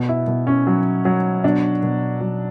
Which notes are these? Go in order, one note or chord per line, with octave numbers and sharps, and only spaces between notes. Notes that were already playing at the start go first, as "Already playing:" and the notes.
Already playing: B2
E4
B2
C#4
F#3
F#3
B2 D4
B2
F#3